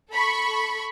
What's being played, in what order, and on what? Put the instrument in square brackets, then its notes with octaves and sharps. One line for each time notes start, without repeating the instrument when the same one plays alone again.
[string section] A4 B5 C#6